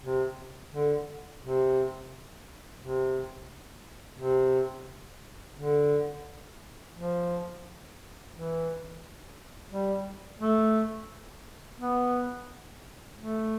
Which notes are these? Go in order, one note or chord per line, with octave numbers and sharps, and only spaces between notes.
C3
D3
C3
C3
C3
D3
F3
E3
G3
A3
B3
A3